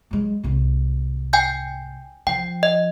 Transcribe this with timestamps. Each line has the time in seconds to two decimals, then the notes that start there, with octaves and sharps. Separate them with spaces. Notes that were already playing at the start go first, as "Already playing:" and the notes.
0.11 F#3 G#3
0.43 C2 G#2
1.33 G5 G#5 G6
2.27 F3 G5
2.63 D#5